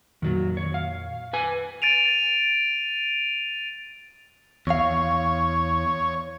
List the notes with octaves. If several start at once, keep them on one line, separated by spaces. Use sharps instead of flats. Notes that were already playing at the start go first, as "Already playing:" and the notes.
F2 A#2 D#3 F#3
C#5
F5
B4 G#5
A6 D7 D#7 F7
E2 C#5 F5